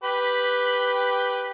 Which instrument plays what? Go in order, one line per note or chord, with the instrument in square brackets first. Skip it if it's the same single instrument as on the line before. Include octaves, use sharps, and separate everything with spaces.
[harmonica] G4 B4